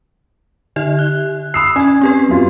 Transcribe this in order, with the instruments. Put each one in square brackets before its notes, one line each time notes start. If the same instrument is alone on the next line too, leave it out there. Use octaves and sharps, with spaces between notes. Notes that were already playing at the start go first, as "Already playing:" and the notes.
[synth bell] D3 G4 E5
F#6
[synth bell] B5 D#6 E6 [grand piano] C7
[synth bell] C#4 G#6 [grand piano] G#5
[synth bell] C4 G4 B4
[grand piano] F#2 B3 F4